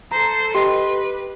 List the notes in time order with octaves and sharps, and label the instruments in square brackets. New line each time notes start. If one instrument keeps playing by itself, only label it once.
[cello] A4 C5 [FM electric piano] A#5
[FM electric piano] G4 [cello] B4 [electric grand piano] D#5 C6